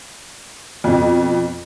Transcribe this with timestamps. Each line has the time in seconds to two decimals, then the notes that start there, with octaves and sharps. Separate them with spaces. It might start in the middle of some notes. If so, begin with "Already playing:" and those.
0.84 F2 B2